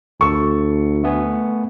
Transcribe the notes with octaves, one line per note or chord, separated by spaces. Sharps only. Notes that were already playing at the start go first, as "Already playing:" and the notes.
D2 A4 C#6
A3 B3 G#5